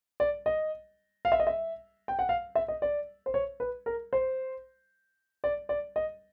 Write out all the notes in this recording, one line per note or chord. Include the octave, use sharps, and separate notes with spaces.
D5
D#5
F5
E5
D#5
E5
G5
F#5
F5
E5
D#5
D5
C5
C#5
B4
A#4
C5
D5
D5
D#5